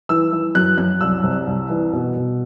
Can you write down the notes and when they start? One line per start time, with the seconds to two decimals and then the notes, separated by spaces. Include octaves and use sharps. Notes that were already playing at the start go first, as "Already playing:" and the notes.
0.09 E3 E6
0.33 E3
0.55 F#2 F#6
0.78 F#2 F#6
1.01 C2 E6
1.24 C3
1.47 C2
1.70 E3
1.93 B2
2.16 B2